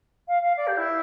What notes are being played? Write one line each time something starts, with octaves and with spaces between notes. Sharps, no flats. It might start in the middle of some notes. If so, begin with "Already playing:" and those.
F5
F5
D5
G4
E4